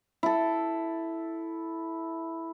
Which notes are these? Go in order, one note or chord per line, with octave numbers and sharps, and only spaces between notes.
E4 A4